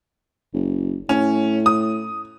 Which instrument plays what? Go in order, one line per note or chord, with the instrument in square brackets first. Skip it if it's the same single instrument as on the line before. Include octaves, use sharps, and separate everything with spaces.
[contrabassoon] F#1
[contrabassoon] A2 [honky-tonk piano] C#4
[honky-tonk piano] D#6